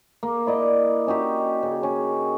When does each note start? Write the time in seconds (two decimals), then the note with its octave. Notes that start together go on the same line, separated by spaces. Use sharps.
0.23 A#3
0.47 E4 D5 D#5
1.07 C#4 D#4 F#4 G4
1.63 C#3
1.83 C#4